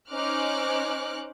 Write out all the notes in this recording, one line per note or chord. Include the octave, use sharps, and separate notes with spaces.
C#4 D#4 C5 D6 F6 F#6